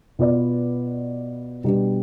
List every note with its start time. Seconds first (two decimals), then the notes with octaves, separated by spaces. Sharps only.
0.19 B2 B3 F4 B4 D5
1.64 B2 G3 B3 D4 G4